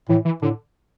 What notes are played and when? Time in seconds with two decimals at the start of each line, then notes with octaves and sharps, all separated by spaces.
0.09 A2 E3
0.25 E3
0.42 A2 D3